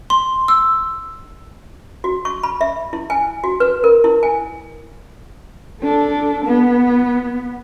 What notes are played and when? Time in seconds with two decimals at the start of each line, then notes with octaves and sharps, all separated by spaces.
0.10 C6
0.48 E6
2.04 F#4
2.25 C#6
2.43 B5
2.61 E5
2.93 E4
3.10 G#5
3.44 F#4
3.60 B4
3.84 A#4
4.04 E4
4.23 G#5
5.82 D4 A4
6.45 B3